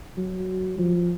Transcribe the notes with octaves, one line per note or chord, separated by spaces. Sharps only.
F#3
F3